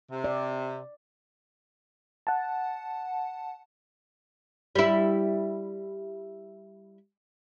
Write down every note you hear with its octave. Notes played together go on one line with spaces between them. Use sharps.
C3
D5
F#5 A5
G3 E4